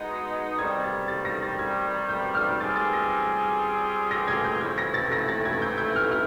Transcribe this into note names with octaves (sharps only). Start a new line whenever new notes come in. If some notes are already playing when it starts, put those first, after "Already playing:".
Already playing: G#3 B3 D#4 F#4
C3 D#3 G3 G#6
A6
A6
A#6
A6
G#6
G6
F6
G3 C4 F4 G#4 A6
A6
A#6
A#6
G#6
G6
C3 E3 A3 C4 E4 G#6
A#6
A6
A#6
A6
G#6
G6
G6
F6
F6